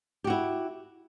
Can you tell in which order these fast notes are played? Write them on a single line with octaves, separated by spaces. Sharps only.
G4 F#4 E4